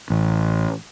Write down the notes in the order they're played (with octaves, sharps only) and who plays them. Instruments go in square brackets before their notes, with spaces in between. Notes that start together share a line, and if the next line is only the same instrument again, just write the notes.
[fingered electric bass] A1